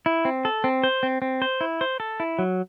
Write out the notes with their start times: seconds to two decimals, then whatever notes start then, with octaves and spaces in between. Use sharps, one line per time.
0.06 E4
0.25 C4
0.45 A4
0.64 C4
0.84 C5
1.03 C4
1.22 C4
1.42 C5
1.61 E4
1.81 C5
2.00 A4
2.20 E4
2.39 F#3